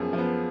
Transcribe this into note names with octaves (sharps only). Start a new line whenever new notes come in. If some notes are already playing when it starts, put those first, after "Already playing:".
Already playing: F#2 F3 B3 G#4
F3
B3